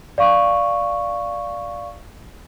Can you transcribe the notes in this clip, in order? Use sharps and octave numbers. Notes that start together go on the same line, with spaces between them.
D5 F5 C#6